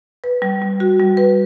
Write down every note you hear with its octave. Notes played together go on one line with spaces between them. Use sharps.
B4
G3
G3
F#4
G3
B4